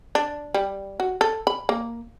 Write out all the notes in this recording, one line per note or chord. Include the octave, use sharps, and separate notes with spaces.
D4
G3
F#4
A4
B5
A#3